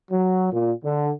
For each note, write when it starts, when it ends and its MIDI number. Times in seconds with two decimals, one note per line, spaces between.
0.11 0.48 54
0.52 0.71 46
0.83 1.10 50